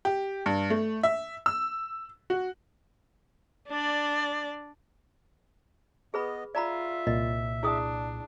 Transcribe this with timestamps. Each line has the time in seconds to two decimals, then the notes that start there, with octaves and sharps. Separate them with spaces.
0.05 G4
0.46 G2
0.70 A3
1.03 E5
1.46 E6
2.30 F#4
3.69 D4 D5
6.14 B3 G#4 B4 D#5 B5
6.55 F4 D5 E5 A#5 B5
7.07 C2 A#2 D#5
7.63 D4 E4 G#4 D#6